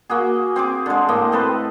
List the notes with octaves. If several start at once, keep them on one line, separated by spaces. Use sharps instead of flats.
A#3 F#4 G#4
C4 G#4 D6
D3 G#3
A2 A#3 D#5
C4 A4 B4